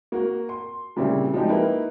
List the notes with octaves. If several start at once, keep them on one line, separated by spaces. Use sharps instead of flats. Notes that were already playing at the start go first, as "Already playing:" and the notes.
A#3 F#4
C6
A#2 C#3 G3 C4 D4 E4
F3 G#3 D#4 G4
A#3 D#4 E4 B4